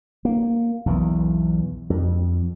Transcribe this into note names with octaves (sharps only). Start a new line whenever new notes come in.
A#3
B1 E2 E3
F2